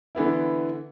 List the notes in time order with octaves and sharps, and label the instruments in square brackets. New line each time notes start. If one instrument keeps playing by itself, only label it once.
[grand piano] D3 E3 B3 E4